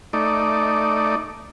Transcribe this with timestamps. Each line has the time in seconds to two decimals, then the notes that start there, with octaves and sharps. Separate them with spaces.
0.13 A3 D#4 D5